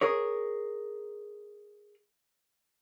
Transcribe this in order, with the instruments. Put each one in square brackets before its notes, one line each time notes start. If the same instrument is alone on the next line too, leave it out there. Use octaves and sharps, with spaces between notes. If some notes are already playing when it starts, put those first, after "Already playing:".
[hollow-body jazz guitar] G#4 A#4 C#5